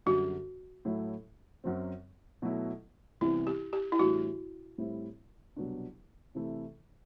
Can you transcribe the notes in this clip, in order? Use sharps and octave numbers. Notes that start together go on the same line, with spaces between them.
F#2 D3 G3 F#4
A2 F#3 A3 E4
F#2 F#3 C4
B2 F#3 A3 E4
C2 C3 E3 B3 E4
G4
G4
E4
A2 E3 G3 D4 F#4
A2 G3 C4 E4
C2 B2 F#3 B3 D4
C3 E3 A3 E4